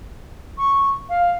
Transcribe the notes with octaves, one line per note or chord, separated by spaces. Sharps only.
C#6
F5